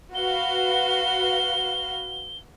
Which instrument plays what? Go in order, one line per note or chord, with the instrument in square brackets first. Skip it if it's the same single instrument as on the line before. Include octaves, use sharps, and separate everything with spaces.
[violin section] F#4 B4 F5 [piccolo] G7